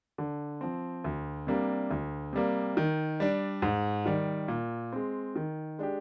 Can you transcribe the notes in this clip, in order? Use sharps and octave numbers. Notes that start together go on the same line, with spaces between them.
D3
F3 C4
D2
C3 G3 A#3 D4
D2
C3 G3 A#3
D#3
G3 D4
G#2
D#3 G3
A#2
G#3 C4
D#3
G#3 D4 G4